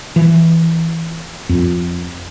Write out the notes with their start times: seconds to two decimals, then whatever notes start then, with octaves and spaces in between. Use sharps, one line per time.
0.16 E3
1.49 F2